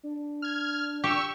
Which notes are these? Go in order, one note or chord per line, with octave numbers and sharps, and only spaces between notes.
D4
F6 G#6
G4 C#6 E6